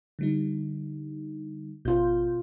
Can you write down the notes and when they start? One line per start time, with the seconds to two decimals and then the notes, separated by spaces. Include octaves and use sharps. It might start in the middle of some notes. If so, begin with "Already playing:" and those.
0.19 D3 G3 D#4
1.85 G#1 B2 F4 G6